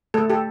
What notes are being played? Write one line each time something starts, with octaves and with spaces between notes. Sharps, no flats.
A3 A4
G4 A4